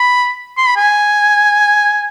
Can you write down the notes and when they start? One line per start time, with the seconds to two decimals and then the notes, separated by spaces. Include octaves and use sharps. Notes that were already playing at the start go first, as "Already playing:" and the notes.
Already playing: B5
0.57 C6
0.67 B5
0.77 G#5